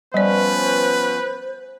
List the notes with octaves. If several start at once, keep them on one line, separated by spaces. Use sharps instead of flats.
F3 G3 B3 C#4 B4 C5 D5